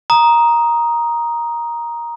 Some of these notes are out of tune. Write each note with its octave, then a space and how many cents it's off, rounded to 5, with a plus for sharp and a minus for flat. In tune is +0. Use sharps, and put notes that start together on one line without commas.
A#5 +10 D#6 +0